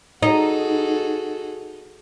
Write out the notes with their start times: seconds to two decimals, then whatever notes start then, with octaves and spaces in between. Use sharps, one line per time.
0.23 D#4 F#4 G#4 A4